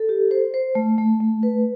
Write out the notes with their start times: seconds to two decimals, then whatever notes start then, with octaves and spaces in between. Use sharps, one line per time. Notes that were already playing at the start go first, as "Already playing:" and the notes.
Already playing: A4
0.09 G4
0.31 C5
0.54 C5
0.75 A3
0.98 A3
1.20 A3
1.43 B4